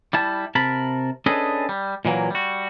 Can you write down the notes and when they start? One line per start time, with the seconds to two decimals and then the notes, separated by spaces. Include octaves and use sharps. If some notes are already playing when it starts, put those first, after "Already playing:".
0.13 G3 E4 A5
0.55 C3 A#4 A5 B5
1.26 C#4 D4 G#4 A4 B4 D#5
1.69 G3
2.05 A#2 E3 F#3 A#3
2.30 G3 F#4